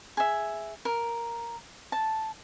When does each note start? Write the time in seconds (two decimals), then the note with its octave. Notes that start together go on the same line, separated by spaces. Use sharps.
0.17 G#4 E5
0.85 A#4
1.92 A5